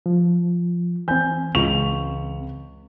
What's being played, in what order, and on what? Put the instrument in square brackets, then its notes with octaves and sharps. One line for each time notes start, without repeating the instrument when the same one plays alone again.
[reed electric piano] F3
[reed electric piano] E3 C4 [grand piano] G#5 G6
[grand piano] C#2 C#6 F7